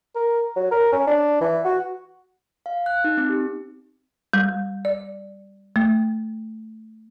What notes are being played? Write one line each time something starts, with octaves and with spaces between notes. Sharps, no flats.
A#4
F#3
A#4
C#4
D4
E3
F#4
F5
F#6
D#4
C4
G4
G3
D5
A3